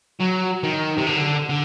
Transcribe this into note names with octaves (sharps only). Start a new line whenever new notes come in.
F#3
D#3
C3
D3
D3